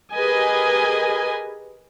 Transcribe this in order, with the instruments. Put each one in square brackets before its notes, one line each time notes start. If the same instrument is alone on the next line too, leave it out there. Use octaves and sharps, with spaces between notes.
[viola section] G4 G#4 A#4 B4 D#5 G#5